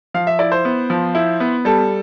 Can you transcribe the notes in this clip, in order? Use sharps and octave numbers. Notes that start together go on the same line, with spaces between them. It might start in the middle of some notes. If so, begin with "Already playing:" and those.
F3 F5
E5
E4 D5
C5
B3
F3
E4
B3
G3 A4